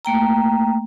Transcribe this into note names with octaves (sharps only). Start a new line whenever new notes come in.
A3 A#3 G5 A#5